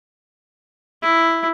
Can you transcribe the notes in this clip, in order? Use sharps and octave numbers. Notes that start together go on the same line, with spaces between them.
E4